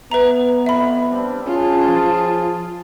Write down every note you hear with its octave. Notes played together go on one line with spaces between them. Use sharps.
B3 B4 E5 A#5
F2 E5 B5
G3 C4 D4
C#4 F4 G#4 A5
F3